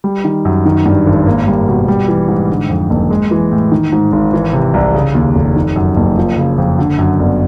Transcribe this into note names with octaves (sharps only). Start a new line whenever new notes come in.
G3
D#3
F#2
D#3
G2
G#1
A#3
G3
B2
G3
E3
G#2
D3
F2
F#1
G#3
E3
A2
D#3
G#2
G#1
E3
C3
C2
C#3
D#2
F1
D#3
F#2
F#1
F3
C#3
F2
D3
F#2
G1